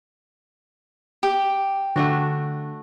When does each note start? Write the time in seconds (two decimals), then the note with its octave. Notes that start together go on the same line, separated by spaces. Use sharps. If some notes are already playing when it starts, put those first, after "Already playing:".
1.23 G4
1.96 D3 A3 D4 F#4